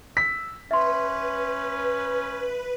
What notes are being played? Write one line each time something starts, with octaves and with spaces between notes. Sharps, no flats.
E6 B6
C#4 B4 E5 C6